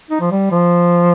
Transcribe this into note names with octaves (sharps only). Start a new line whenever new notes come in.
D#4
F3
G3
F3